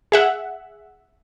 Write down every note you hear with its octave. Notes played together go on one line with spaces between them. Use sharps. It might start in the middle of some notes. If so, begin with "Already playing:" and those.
G#4 E5 F#5